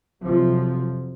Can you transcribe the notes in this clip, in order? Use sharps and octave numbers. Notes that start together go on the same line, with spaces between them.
F2 C3 F3 F#3